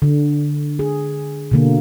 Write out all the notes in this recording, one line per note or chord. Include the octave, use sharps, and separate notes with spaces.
D3
G#4
B2 D3 A#3